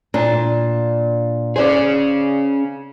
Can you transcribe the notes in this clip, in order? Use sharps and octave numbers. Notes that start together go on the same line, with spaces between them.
A#2 D4
C#4 G#4 C5 D5